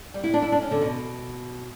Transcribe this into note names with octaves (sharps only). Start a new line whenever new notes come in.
G3
E4
D4
E4
D4
C#4
D3
B2